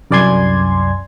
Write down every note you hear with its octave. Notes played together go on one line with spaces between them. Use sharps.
C2 F#2 D5 G#5 C6 G#6